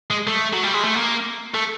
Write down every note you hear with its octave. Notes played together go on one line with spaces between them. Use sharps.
G#3
A3
F#3
G3
G#3
A3
A#3
A3